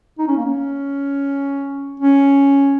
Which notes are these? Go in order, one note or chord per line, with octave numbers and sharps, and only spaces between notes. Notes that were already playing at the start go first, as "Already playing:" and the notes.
D#4
C#4
A#3
C#4
C#4